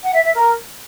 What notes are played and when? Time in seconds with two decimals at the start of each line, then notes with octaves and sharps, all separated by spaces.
0.03 F#5
0.14 E5
0.24 E5
0.35 A#4